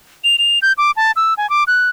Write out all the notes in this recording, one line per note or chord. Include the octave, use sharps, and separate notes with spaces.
F7
F7
G6
D6
A5
E6
G#5
D6
F#6